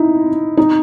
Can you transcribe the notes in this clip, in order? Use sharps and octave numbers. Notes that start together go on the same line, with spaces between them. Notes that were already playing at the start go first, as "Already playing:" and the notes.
Already playing: D#4 E4
D#4